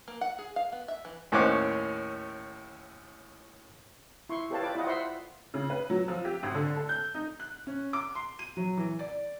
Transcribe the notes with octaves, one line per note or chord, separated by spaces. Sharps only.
A#3
F#5
G#4
F5
B3
E5
E3
D#2 A2 C#4 C5 D6 F#6
E4 C6 C#6
G4 A4 B4 C#5 F5 A5
F4 B4 D5 D6
E4 F4 D#5 F#5
C5 E5 F#5 B5 C6
C#3
B4
F#3
F3
G4
G#1
D3
A4
G6
D#4
F#6
C#4
D6
C6
D#7
F#3
E3
D5